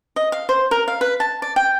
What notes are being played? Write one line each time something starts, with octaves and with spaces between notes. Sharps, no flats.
D#5
F5
C5
A#4
F5
B4
A5
D5
G5